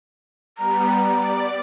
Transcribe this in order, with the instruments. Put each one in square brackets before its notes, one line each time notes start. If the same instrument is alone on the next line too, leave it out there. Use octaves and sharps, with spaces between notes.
[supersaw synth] G3 B3 [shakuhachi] A#5
[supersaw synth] D5